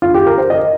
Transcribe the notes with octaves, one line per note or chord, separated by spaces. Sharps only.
F4
G4
A#4
C5
D#5